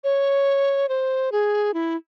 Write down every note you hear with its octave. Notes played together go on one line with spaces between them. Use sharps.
C#5
C5
G#4
E4